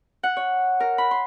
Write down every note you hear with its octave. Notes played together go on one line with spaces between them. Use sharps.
F#5
C#5
A#4
B5
C6